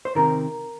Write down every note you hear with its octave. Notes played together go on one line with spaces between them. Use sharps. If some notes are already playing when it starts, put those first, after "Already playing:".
C5
C3 D#3 A#4